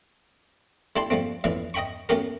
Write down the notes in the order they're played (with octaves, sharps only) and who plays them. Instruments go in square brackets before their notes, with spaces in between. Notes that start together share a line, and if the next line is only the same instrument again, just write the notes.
[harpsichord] D3 E4 G4 A5 C6
F3 G3 A3 C4
F2 A2 D3 E3
D#5 E5 G5 B5 C#6
A3 C#4 F#4 G4 A#4